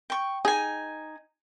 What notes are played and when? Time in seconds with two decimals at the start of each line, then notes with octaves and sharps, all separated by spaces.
0.10 G5 C#6
0.45 D#4 G#4 G#5